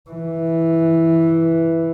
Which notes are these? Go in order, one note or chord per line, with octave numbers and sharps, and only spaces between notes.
E3